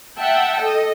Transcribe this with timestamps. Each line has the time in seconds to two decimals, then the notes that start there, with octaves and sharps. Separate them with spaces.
0.18 E5 F#5 G5 A5
0.61 A4 D#5